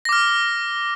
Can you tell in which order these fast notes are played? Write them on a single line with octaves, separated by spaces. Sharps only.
A#6 D6 F6